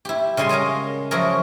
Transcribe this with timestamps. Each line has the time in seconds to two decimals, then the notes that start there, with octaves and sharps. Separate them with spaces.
0.05 E4 G4
0.37 C#3 G3 G#3 G#5 C6
0.49 G#3 G#4 A#4 F5 A#5
1.11 F3 F#3 E4 F#4 G#4 A#4